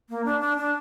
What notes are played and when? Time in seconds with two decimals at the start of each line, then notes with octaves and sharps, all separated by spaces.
0.09 A#3
0.25 D4
0.41 D4
0.57 D4